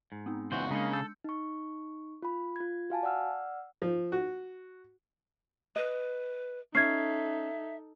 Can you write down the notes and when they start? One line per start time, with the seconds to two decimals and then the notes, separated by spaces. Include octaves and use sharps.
0.12 G#2
0.26 B3 C4 D#4
0.52 C#2 E3 F#4 C5
0.71 C#3 G#3 A#3 D4 D#4 C#7
0.93 A4 E6 G6
1.24 D#4 C#6
2.22 F4 B5
2.56 F4 G#6
2.90 F#4 F5 G#5 A5
3.03 D5 F#5 E6 F6
3.82 F3
4.12 F#4
5.76 B4 D#5
6.75 C#4 D#4 A4 E5 G#6 C7